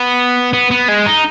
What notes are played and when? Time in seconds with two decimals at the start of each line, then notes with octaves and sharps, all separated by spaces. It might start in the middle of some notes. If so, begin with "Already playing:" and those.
Already playing: B3
0.53 B3
0.71 B3
0.88 G#3
1.06 D#4